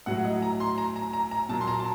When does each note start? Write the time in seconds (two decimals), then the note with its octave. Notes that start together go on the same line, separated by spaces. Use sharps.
0.06 A2 F#3 F#5
0.24 D#5
0.42 A#5
0.60 C6
0.78 A#5
0.96 A#5
1.13 A#5
1.31 A#5
1.49 A#2 F#3 A5
1.61 C6
1.68 A#5
1.80 A5